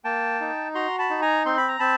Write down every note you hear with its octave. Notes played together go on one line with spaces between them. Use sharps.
A#3 G5 A5
D#4
F#4 A#5 C6
A5 B5
D#4
G#5 A#5
C4 C6
B5
A#5
C4 A5 B5